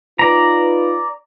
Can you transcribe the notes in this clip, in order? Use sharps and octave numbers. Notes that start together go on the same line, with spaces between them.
D#4 F4 B4 D5 A#5